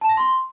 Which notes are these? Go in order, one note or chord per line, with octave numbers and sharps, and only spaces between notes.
A5
A#6
C6